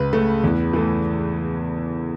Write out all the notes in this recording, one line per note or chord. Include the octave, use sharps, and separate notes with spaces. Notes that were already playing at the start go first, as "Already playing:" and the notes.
Already playing: C#2 B4
C#3 A3
E2
E3 A3